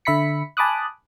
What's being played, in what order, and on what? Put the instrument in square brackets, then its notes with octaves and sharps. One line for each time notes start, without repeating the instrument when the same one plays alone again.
[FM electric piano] D3 E5 B5 B6 C#7
G#5 A5 B5 D6 D#6 F#6